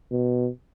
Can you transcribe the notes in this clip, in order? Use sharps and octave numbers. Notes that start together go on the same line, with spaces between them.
B2